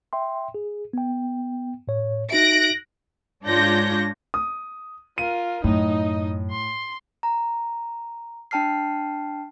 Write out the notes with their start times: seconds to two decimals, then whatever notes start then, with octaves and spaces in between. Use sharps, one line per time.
0.13 E5 G5 C6
0.54 G#4
0.93 B3 G5
1.88 A2 C#5
2.31 D#4 F#4 E5 F#6 A#6 D7
3.46 G#2 D4 F4 C#5 G6 A#6
4.34 D#6
5.18 F4 A#4 D#7
5.64 F#2 A2 D#4 D#5
6.51 C6
7.23 A#5
8.51 D4 G5 A5 F6 C7